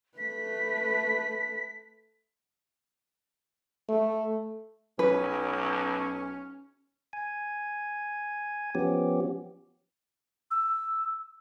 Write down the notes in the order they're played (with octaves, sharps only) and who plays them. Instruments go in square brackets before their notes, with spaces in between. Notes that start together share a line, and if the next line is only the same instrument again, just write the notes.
[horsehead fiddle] A3 B4 [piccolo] B6
[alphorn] A3
[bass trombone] B1 [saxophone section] C#4 [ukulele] B4
[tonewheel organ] G#5
F3 B3 C#4 G4
[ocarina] E6